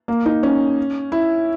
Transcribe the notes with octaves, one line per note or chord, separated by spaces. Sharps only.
A#3
D#4
C#4
E4